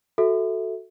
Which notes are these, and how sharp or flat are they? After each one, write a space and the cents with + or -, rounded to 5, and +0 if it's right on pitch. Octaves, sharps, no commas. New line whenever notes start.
F#4 +0 A4 +0 E5 -10